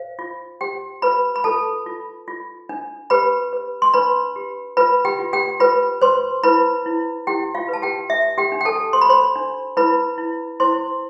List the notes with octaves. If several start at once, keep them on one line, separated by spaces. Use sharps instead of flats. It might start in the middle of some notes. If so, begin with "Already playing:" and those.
Already playing: C5 F5
F4
G4 C5 G5
F4 B4 B5
B5
F4 A4 A5
F4
F4
D4
G4 B4 B5
B4
C6
D4 B4 B5
G4
F4 B4 B5
G4 G5
F4
G4 G5
F4 B4 B5
B4 C5 C6
E4 B4 B5
E4
E4 G4 G5
F4 F5
B4
A5
G4 G5
D4 E5
G4 G5
D4
G5
A4 A5
C5 C6
B5
C5 C6
D4
E4 B4 B5
E4
E4 C5 C6